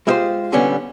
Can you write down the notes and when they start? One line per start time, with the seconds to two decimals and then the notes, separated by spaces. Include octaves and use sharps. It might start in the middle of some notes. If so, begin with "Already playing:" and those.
0.07 G#3 E4 F4 G4 C5
0.52 A#2 D3 G3 B3 C#4